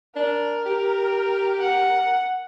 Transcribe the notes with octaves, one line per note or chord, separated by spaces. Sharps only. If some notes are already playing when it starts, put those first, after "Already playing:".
D4 A#4
G4
F#5